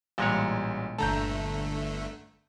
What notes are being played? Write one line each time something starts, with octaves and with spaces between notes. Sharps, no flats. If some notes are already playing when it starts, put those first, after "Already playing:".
A1 A#2 G3 G#3 C#5
G1 D3 A3 A5 A#5 G6